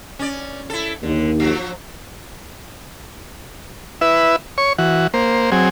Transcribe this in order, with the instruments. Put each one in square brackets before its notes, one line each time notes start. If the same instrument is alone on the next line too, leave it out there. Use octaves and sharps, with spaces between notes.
[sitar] C#4 D5
E4 A4
[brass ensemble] D#2 [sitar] D3
[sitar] F3 F#3
[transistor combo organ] E4 B4 E5
C#5 C#6
E3 F#4
A#3 C5
F#3 C4 G#4